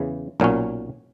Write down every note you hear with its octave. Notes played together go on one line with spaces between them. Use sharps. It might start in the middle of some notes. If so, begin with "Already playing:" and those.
Already playing: E2 C#3 E3
B1 A#2 F#3 C#4